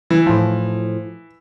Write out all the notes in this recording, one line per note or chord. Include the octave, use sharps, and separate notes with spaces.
E3
A2 F3